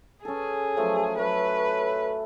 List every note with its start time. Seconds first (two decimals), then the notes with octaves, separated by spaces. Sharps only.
0.25 C#4 G#4 A4
0.77 F3 F#3 A3
1.19 F#3 A3 B4 C#5